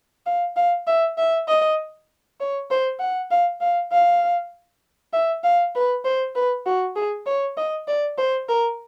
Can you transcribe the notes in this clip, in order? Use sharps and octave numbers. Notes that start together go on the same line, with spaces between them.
F5
F5
E5
E5
D#5
C#5
C5
F#5
F5
F5
F5
E5
F5
B4
C5
B4
F#4
G#4
C#5
D#5
D5
C5
A#4